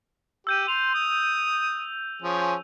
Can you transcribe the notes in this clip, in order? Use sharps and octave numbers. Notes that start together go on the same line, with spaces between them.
G4 E6 G6 D#7
C6 F7
D#6
F3 C#4 G#4